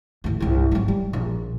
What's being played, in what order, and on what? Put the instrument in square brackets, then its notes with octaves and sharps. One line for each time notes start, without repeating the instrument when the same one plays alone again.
[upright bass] A1 D2
C2 G2
G#1 F#3
G3
A#1